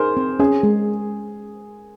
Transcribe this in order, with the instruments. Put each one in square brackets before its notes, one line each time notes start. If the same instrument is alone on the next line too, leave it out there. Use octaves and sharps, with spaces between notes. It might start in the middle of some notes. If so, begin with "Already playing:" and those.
Already playing: [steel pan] D#4 [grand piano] G#4 A#4 C5
[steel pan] C4
[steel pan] C#4 [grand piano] G#4
[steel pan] G#3